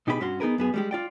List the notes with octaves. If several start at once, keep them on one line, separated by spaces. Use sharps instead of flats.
B2 D#4 G4 G#4 C5 B5
G2 C#4 F#4 C6
B3 D#4 F#4 G#4 A#4 B4
F#2 B3 G#4
G3 G#3 G4
F4 D5 G5